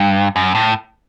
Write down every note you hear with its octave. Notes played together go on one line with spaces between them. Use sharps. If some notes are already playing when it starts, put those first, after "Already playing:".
Already playing: G2
F#2
A2